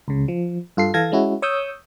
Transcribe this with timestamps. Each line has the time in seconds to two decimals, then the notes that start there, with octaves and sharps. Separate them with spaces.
0.08 C#2 C#3
0.28 F3
0.77 G2 F4 A4 C7
0.94 E3 A4 F5 A5 G#6 A#6
1.12 G#3 C#4 E4 F#4
1.42 C#5 C#6 D#6 E6 G6